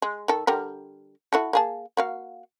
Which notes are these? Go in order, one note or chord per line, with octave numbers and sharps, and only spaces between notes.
G#3
D#3 A4
D3 G3 A#4
E4 F#4 A4
A#3 G#4 A5
A#3 F#4 F5